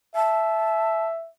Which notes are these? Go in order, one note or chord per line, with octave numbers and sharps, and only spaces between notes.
E5 A5